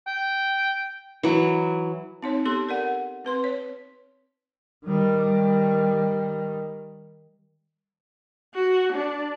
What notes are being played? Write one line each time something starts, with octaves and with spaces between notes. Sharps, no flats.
G5
E3 F#3
C4 D#4 C#5
B3 G4 A4 C6
A#4 D5 F#5
C4 B4 C6
C#5
D#3 G3
F#4
D4